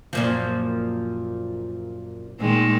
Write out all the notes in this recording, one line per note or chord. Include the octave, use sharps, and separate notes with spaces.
F#2 A#2 F3
A#2 D#3 G#3